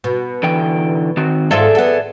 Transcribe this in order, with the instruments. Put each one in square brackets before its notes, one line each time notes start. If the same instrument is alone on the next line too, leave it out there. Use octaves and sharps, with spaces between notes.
[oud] B2
[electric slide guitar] D3 E3 G5
D#3 C4 F#4
[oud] G#2 F4 A4 [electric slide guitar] G#4 D5 E5
[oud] B3 A4